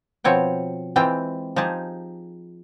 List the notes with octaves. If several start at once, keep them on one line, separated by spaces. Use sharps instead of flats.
B2 F3 C4 C#5 G5
E3 G#3 C4 F4 G5
F3 D#4 G4 G#4 A5